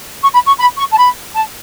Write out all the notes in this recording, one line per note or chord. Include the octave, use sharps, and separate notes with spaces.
C#6
B5
C#6
B5
C#6
A5
B5
A5